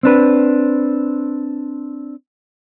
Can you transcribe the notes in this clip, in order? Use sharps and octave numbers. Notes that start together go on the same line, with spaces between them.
C4 D4 B4